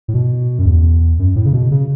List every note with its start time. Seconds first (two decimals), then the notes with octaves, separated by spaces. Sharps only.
0.08 A2
0.14 B2
0.59 F#2
0.66 E2
1.19 F#2
1.36 A2
1.46 C#3
1.53 B2
1.71 C#3